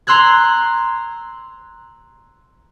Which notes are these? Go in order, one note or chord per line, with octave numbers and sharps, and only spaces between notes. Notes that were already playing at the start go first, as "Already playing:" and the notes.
A#5 C6 E6 F#6 G#6